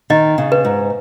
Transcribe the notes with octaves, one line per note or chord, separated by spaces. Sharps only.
D#3 D#5
C#3
B4
G#2